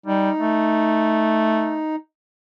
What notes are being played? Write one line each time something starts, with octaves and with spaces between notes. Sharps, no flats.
G3 D#4
A3